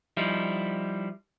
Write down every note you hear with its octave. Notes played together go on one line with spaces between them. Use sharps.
F3 G3 D#4 E4